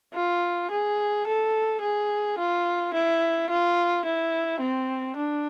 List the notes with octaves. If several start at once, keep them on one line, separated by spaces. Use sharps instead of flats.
F4
G#4
A4
G#4
F4
E4
F4
E4
C4
D4